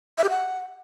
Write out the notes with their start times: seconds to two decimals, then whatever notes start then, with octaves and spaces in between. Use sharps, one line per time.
0.18 E5
0.24 G4
0.30 F#5